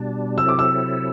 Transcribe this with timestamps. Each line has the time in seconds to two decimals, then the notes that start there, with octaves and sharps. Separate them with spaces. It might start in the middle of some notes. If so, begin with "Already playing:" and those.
Already playing: B2 G3 D4
0.38 C3 F#3 C4 E4 A4 E6
0.48 D6
0.59 E6